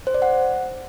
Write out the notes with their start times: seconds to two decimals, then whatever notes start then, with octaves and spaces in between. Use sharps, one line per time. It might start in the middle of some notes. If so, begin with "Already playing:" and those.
0.07 C5
0.14 D5
0.22 F#5